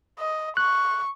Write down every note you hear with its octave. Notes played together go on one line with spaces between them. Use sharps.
D#5
C#6 F#6